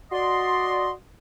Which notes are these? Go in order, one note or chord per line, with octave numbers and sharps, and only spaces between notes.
F#4 D5 D#5 C6